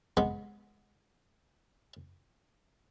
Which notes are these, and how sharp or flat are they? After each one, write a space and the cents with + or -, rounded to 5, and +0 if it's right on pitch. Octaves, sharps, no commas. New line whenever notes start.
G#3 +0 B3 -10